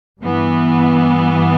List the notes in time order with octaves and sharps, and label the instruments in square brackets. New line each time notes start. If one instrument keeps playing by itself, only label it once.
[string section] G2 E3 B3